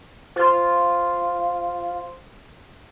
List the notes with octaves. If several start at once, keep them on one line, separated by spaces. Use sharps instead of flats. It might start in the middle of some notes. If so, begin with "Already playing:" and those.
F4 C5 C6